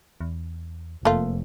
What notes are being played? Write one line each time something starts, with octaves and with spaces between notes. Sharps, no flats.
E2
F1 A3 A#3 F4